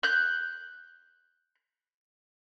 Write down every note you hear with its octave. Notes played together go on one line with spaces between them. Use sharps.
F#6 G6